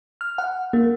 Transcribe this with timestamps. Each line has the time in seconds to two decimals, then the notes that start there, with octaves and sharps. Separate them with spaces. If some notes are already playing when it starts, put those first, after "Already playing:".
0.21 F6
0.38 F#5
0.73 A#3